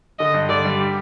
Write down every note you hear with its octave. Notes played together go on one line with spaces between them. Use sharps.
D3 D#5
G2
D3 D5
G3
G4